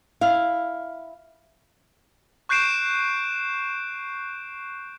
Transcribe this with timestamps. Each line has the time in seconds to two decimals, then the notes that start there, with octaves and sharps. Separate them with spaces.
0.21 E4 F5
2.49 C#6 F#6 G6 C7 D7 E7